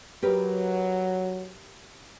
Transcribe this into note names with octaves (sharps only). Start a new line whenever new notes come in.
F#3 G4 A#4 B4